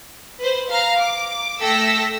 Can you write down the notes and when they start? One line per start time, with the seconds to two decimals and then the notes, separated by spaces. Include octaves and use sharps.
0.40 B4 C5
0.70 F5 A#5
0.99 D6
1.62 A3 A4 G5 E6 A#6 B6